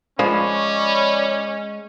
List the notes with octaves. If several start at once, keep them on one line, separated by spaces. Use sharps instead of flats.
F3 G#3 C#4 C#5 D5 B5